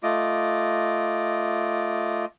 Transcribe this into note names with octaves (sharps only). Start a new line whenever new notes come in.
A3 F4 D#5 D6